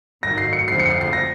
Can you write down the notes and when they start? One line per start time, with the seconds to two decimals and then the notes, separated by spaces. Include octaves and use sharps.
0.23 G#2 D#3 F#3 A#6
0.38 C7
0.53 C#7
0.68 F2 D3 F3 G#3 C4 C7
0.79 C#7
0.90 C7
1.01 C7
1.13 A#6